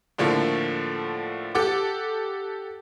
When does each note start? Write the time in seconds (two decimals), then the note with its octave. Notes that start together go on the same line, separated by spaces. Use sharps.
0.18 A2 D3 F3 A3 A#3
1.55 G4 A4 F#5 D6